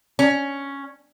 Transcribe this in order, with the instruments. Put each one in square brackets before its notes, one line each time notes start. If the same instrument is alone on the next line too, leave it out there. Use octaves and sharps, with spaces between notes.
[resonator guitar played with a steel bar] C#4